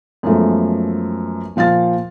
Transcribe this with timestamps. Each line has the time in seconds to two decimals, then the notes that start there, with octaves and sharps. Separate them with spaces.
0.23 F#2 F3 G#3 A3 B3
1.56 A#2 F3 F5 F6 A6